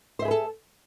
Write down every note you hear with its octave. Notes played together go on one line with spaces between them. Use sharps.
G#4 A4 B4 C5 E5